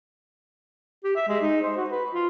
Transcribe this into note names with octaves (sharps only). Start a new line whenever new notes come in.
G4
E5
G#3
D#4
C5
F#4
B4
F4